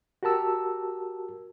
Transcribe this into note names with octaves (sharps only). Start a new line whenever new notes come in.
F#4 G4 A#4 A5 E6